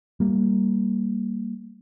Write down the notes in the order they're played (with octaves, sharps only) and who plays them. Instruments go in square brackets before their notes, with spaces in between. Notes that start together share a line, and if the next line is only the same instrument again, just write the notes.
[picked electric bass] G3 A#3